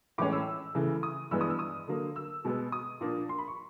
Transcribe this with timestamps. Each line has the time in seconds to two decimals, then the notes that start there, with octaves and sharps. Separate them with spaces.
0.18 A2 E3 G#3 C#4 D6
0.33 E6
0.75 C#3 E3 A3
1.03 D#6
1.31 G2 E3 G#3 B3 E6
1.41 D#6
1.50 E6
1.59 D#6
1.88 D3 F#3 A#3
2.16 E6
2.45 B2 G#3 B3
2.72 D#6
3.01 A#2 F3 A#3 D4
3.29 C6
3.38 B5
3.48 C#6